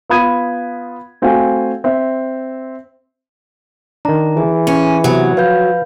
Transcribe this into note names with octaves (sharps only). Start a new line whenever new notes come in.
B3 F4 B5 D#6 G#6 D#7
A3 C4 F#4 F5 G5 G#5
C4 E5
D#3 D4 A#5
E3 G#4
C#4 G#5
C3 F#3 B3
F3 B4 F5 G6